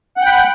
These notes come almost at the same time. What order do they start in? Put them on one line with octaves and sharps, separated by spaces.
F#5 G5 B5